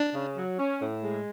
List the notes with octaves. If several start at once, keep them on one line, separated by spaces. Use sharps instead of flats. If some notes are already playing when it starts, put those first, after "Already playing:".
Already playing: D4
C#3
F#3
C#4
A2
G#3